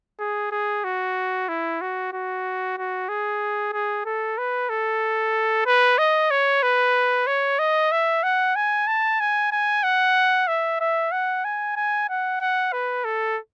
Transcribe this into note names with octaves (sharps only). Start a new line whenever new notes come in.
G#4
G#4
F#4
E4
F#4
F#4
F#4
G#4
G#4
A4
B4
A4
B4
D#5
C#5
B4
C#5
D#5
E5
F#5
G#5
A5
G#5
G#5
F#5
E5
E5
F#5
G#5
G#5
F#5
F#5
B4
A4